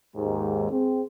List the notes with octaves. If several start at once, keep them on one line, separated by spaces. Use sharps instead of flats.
D#2 G#2
C4 G#4